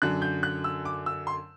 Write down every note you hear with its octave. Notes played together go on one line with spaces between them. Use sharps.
F#2 D3 F#3 F#6
G6
F#6
E6
D6
E6
C6